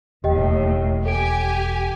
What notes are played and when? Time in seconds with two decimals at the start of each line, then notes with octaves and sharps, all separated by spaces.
0.24 E1 D#2 A2 G4 D#5 G5
1.06 G4 A4 G#5 D7